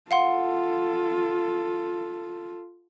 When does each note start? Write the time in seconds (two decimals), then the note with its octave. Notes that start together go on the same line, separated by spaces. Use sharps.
0.11 F4 A4 F5 F#5 C6